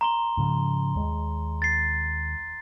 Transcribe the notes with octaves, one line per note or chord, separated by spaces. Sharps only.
A#5 C6 G7
G#2 C#3 F3
D#2 G#3
A6 C7